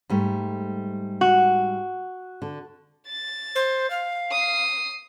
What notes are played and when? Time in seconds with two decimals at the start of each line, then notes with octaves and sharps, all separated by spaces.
0.10 G#2 G3 A3
1.21 F#4
2.42 D3
3.06 A6
3.55 C5
3.90 F5
4.31 D#6 C7